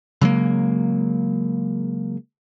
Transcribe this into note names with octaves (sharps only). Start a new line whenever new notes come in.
C#3 F#3 G#3 A#3